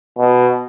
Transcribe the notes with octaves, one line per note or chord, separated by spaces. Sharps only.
B2